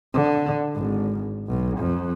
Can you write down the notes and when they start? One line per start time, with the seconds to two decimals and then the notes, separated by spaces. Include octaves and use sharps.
0.14 D3
0.75 G#1
1.48 B1
1.79 F2